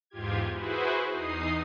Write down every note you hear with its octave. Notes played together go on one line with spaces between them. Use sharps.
E2 G#2 F4 G4 G#6
E4 F#4 G#4 B4 C5
E2 D#4 D#6 C7